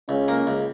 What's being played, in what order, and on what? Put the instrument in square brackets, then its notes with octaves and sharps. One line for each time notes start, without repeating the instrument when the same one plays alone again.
[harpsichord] C#2 [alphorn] C#4
[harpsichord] A#3
C#2